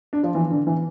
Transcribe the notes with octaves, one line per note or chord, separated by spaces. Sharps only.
D4
F3
E3
D3
E3